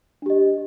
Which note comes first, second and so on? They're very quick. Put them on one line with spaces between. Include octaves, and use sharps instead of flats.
D4 G4 D#5